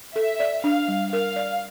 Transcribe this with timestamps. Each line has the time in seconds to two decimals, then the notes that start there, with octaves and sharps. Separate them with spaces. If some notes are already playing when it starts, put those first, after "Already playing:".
0.16 A4 E5
0.40 D5
0.64 D4 F5
0.88 G3
1.13 A#4 F5
1.36 D5